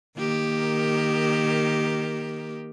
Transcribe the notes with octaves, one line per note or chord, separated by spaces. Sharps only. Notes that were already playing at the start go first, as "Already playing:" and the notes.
D#3 A#3 G4